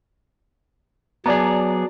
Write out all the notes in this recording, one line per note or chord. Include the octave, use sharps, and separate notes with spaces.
F#3 B3 G#4 D5 A5 A#5